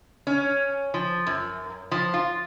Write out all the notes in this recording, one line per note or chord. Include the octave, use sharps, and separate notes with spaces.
C#4
F3
F#2
F3
F4